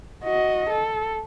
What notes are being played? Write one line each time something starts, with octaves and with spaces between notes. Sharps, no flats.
F#4 D#5
A4